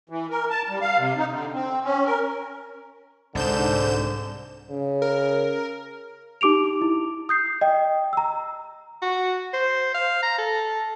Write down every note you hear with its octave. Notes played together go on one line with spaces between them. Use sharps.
E3
A#4
A5
G3
F5
C3
D#4
D3
C4
C#4
A#4
C2 G#2 D3 C5 G6 E7
C#3
A#4
D#4 G4 D6 D7 F7
E4
D#6 G6 C7
D#5 G5
A#5 E6
F#4
C5
F5
A#5
A4